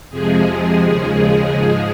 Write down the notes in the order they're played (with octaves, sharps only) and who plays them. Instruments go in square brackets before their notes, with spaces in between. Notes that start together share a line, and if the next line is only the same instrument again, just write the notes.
[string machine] F2 C3 F3 G#3 G#4
D#2 C#3 F3 G#3
G#2 F3 G#3